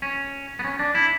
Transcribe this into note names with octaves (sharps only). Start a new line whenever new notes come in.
C#4
B3
C#4
D4
E4